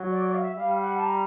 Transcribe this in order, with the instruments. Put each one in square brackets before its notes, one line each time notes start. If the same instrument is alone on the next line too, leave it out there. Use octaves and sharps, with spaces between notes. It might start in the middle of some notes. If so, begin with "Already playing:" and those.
Already playing: [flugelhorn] F#3
[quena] D5
D5
F5
E5
[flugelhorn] G3 [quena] F5
[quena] F#5
A5
A#5